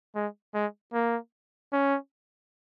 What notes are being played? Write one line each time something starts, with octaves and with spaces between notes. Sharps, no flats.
G#3
G#3
A#3
C#4